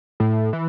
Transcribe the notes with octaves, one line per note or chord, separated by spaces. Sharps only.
A2
E3